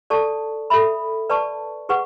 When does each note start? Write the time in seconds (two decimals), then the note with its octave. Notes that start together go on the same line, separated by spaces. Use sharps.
0.10 A4 D5 A5 C#6
0.70 A4 E5 B5
1.30 B4 D5 A5 C#6
1.89 G#4 B4 F#5 C#6